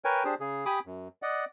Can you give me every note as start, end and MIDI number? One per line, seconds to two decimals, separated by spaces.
0.05 0.24 70
0.05 0.24 71
0.05 0.24 73
0.05 0.24 79
0.05 0.24 80
0.25 0.35 62
0.25 0.35 67
0.25 0.35 68
0.25 0.35 72
0.40 0.65 49
0.40 0.65 68
0.66 0.79 67
0.66 0.79 80
0.66 0.79 83
0.66 0.79 86
0.66 0.79 87
0.86 1.08 42
1.22 1.45 74
1.22 1.45 75
1.22 1.45 78